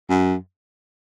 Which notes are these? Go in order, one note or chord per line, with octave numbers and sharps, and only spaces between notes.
F#2